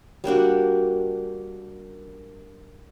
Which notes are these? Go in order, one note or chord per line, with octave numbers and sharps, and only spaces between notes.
G3 A#3 D4 F#4